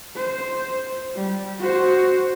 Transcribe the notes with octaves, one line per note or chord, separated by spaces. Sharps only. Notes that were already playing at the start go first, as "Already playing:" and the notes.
C5
G3
F#4 C5